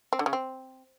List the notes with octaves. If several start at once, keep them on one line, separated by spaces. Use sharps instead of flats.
C4
D3
C#3
C4